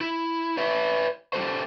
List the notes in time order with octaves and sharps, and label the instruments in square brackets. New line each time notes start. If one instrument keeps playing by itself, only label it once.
[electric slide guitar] E4
B4 C#5 E5
G3 G#3 A4 C5